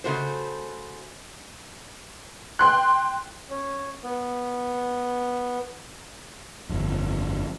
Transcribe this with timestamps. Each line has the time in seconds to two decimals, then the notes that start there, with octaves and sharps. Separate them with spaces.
0.04 C#3 A3 F#4 C5
2.59 G5 C6 F#6
3.50 C#4
4.04 B3
6.69 G1 F2